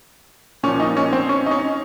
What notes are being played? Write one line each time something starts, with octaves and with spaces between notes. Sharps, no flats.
A#2 F3 C#4
D#4
C#4
C4
C#4
D#4
C#4